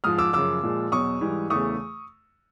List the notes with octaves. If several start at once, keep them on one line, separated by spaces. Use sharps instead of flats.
G#2 F3 G#3 D#6 F6
D6 E6
F#2 C#3 F3 D6 E6
A#2 F3 G#3
E2 B2 F#3 C#6 D#6
G#2 E3 G3
E2 C#3 E3 A3 C#6 D#6